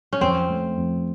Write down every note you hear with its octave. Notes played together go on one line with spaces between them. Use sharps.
C#4
F2 C4
A3
F2